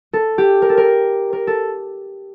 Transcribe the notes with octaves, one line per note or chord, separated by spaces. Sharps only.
A4
G4
A#4
A4
A#4
A#4
A4